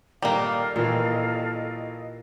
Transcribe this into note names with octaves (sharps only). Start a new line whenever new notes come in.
A#2 D#3 G3 A#3 A4 D#5 F5
A#2 D#3 E3